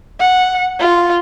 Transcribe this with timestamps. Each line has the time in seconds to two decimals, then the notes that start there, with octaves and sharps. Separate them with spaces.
0.20 F#5
0.80 F4